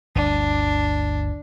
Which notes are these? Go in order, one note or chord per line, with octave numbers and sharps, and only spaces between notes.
G1 D2 D4